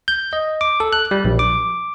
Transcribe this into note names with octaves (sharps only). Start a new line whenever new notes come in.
G6
D#5
D6
A4
F#6
G3
A#1
D6